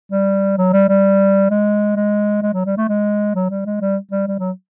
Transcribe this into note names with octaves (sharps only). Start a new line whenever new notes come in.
G3
F#3
G3
G3
G#3
G#3
G#3
F#3
G3
A3
G#3
F#3
G3
G#3
G3
G3
G3
F#3